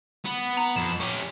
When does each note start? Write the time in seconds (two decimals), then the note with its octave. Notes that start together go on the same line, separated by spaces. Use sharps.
0.24 B3
0.57 A#5
0.76 F2 E7
1.00 C#4 G4